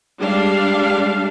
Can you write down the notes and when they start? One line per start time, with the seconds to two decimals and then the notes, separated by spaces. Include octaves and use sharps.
0.18 G3 G#3 D4 F5